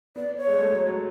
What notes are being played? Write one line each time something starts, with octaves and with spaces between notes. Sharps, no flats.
B3 D5
C#5
G#3
A3
F#3
F#3